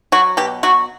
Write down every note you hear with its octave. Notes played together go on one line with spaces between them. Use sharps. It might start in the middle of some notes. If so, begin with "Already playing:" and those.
F#3 F#4
B2 G4
F#3 F#4